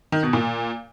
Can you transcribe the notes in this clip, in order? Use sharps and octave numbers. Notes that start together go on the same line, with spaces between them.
D#3
B2
A#2